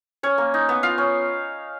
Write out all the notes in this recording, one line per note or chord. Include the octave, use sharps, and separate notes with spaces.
C#4 C#5
A#3
D#4
B3
F4 F5
C#4